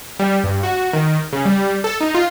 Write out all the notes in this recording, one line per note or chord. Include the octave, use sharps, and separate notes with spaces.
G3
G2
F#4
D#3
C#3
G3
A4
D#4
F4